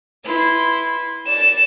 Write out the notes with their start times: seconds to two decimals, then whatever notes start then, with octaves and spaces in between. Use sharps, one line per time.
0.23 E4 B4 C6
1.27 D5 E7